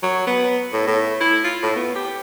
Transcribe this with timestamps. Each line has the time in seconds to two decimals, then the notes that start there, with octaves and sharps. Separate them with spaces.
0.03 F#3
0.27 B3
0.73 A2
0.87 A2
1.21 E4
1.44 F4
1.63 A2
1.76 B3
1.96 G4